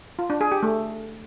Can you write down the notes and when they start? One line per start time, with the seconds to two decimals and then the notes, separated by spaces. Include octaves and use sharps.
0.19 F4
0.30 D4
0.41 G#4
0.52 G4
0.63 A3